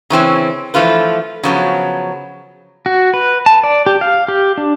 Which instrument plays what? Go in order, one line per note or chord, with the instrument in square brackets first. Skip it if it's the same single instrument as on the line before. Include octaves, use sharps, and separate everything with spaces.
[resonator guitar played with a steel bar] C#3 E3 C4 C#4
E3 F3 A3 F4 B4
C#3 F3 F#3 B3
[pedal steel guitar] F#4
B4
A5
D5
G4
F5
G4
D4